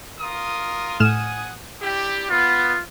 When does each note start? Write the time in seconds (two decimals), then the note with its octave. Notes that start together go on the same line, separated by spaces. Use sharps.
0.18 F4 A#4 D#6
1.00 A2 F#5 G#5 D#6 F6 E7
1.81 D4 E4 G4
2.30 B3 F4